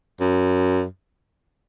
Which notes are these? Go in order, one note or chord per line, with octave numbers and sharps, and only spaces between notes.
F#2